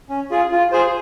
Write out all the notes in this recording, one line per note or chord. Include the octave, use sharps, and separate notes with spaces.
C#4
F4 G#4
F4
G#4 C5